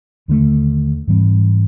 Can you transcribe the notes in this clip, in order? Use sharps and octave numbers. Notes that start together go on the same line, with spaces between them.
D#2 D3 F3 A3
G#2 E3 G3 C4